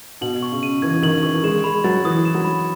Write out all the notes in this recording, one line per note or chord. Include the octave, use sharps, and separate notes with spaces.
B2 F#7
C#6
C#3
D#7
E3 G#6
D#3 F#7
E3 C#6
G#3 E7
G#3 B5
F#3 A6
E3 D#6
E7
F#3
B5